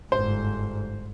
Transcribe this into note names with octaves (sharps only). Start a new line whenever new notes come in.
G1 G#2 C5